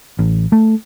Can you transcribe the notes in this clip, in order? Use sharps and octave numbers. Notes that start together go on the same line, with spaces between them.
A1
A3